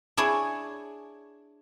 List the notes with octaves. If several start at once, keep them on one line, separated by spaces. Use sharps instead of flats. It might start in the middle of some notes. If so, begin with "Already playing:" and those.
D4 E4 G#4 C#5